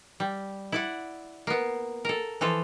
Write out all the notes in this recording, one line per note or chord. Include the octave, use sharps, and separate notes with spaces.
G3
E4 D5 F#5
A#3 B3
A4 A#4
E3 F3 F4 A4